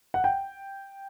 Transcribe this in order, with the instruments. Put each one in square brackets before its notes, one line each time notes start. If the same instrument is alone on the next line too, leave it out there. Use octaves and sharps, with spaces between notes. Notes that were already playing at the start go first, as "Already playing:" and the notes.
[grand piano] F#5
G5